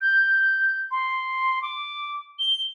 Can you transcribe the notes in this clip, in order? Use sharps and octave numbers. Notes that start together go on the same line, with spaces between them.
G6
C6
D6
G7